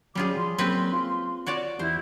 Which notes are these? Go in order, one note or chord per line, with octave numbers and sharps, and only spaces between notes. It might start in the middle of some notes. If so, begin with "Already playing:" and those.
F#3 G3 C#4 F4 F#4 G#4 D6
F3 C6
F#3 A#3 C4 C#4 B4
F4 F5
F#4 C#5 D5
E2 E4 F4 G4 C5